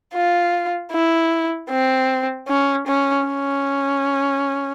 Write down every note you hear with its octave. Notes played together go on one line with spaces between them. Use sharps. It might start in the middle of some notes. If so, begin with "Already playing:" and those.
F4
E4
C4
C#4
C#4
C#4